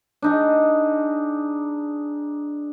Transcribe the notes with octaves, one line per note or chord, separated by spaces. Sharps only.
D4 D#4 G#4